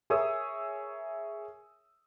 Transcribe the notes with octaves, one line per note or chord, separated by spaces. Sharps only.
G#4 A#4 C#5 E5 D#6 E6